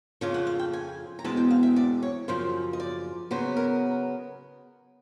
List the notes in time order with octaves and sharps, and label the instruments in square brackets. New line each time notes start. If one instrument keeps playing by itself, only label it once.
[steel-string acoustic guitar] F2 C#3 F3 G#5
F#5
F5
G5
G#5
A#5
E2 B2 G#3 C4 A5
G5
F5
E5
D5
C#5
F#2 C#3 F3 C5
D#5
D5
C#3 F#3 B3 C5
A#4